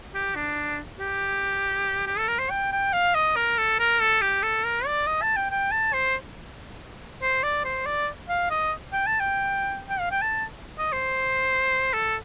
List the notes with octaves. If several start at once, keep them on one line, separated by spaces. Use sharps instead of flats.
G4
D4
G4
G4
A4
A#4
C5
G5
G5
F5
D#5
A#4
A4
A#4
A4
G4
A4
A#4
D5
D#5
A5
G5
G5
A5
C5
C5
D5
C5
D5
F5
D#5
G5
A5
G5
G5
F5
G5
A5
D#5
C5
A4